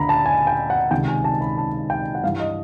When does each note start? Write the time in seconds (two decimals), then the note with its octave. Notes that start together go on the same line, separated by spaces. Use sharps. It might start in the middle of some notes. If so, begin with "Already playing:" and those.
Already playing: D2 D3 A#5 B5
0.09 A5
0.26 G#5
0.47 G5
0.70 F#5
0.91 C#2 C3 D#3 G5
1.08 G#5
1.24 A5
1.41 B5
1.58 A5
1.90 G5
2.15 F#5
2.23 G2 E3 F5
2.39 D#5